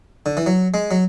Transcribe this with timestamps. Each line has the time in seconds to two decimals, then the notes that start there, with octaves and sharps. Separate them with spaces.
0.26 D3
0.37 E3
0.46 F#3
0.74 G#3
0.91 F#3